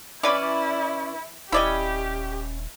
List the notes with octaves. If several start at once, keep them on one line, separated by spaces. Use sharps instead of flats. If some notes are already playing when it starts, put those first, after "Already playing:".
E3 C#4 E4 B4 D5
D#1 C#4 E4 G4 D5 D#5 B5